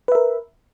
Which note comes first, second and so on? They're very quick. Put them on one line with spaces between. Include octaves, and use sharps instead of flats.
B4 E5 A#4